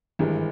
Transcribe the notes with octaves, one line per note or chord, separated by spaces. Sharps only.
G#1 G2 E3 G#3